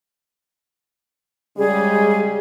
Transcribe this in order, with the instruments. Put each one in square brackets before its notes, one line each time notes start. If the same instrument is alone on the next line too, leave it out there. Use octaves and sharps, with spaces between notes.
[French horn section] C#3 G3 G#3 [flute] G#4